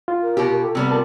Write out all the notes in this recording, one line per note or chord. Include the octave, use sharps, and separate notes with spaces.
F4
A#4
B2 G4
A4
C3 G3 B3
F4 A#4 A5